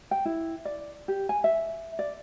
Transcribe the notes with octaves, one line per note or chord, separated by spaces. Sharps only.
G5
E4
D5
G4
G#5
E5
D5